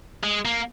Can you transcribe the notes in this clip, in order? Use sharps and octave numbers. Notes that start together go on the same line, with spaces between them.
G#3
A#3